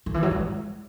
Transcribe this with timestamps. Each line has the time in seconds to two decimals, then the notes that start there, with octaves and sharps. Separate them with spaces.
0.06 D#3
0.14 E3
0.23 F#3
0.31 G#3